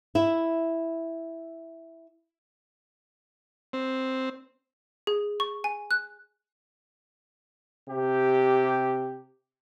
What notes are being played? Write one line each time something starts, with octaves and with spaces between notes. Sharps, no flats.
E4 E5
C4
G#4
C#6
G#5
F#6
C3 G4